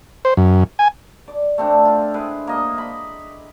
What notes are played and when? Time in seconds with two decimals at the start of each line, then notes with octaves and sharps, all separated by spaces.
0.25 C5
0.37 F#2
0.79 G#5
1.28 D5
1.58 A3 C4 D4
1.85 F4
2.14 G#3 E4 B4 C5
2.47 A#3 D#5
2.78 B5